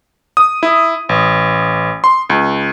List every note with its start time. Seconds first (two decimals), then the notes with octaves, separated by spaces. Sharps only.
0.37 D#6
0.63 E4
1.09 A1
2.04 C6
2.30 C#2